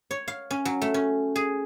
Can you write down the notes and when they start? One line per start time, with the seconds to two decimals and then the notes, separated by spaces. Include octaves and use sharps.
0.11 C#5
0.28 F5
0.51 C#4
0.65 F#3
0.82 A3
0.94 C#4
1.36 G#4